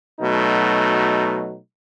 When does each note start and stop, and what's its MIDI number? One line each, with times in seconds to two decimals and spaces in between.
0.21 1.58 47
0.21 1.58 54
0.21 1.58 57
0.21 1.58 63